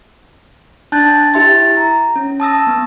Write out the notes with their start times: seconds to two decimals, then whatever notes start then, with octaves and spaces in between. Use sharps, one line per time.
0.92 D4 A5 F#6 G6 A6
1.34 E4 G4 E5 C6 A6
1.77 A#5
2.16 C#4
2.40 A5 D#6 E6 A#6
2.67 B3